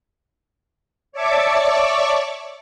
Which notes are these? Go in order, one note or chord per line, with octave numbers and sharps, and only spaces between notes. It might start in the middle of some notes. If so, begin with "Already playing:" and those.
C#5 D5 E5 A5 C#6 D6